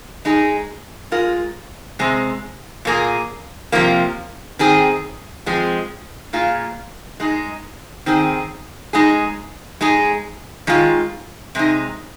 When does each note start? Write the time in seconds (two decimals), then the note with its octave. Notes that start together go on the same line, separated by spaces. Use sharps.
0.25 G#3 D#4 G#4
1.11 G#3 F4 A#4
1.99 C3 G#3 C4
2.85 A#2 A#3 G#4
3.72 C3 F3 A#3
4.59 D#3 C4 G#4
5.46 F3 G#3 C4
6.33 A#2 A#3 F4 G#4
7.20 G#3 D#4 G#4
8.06 D#3 C4 G#4
8.93 G#3 D#4 G#4
9.81 G#3 D#4 G#4
10.67 D#3 G#3 F4
11.55 C3 G#3 D#4